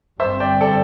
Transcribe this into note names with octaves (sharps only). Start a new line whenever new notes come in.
G1 G2 G3 C4 C5 E5
D5 G5
A4 D5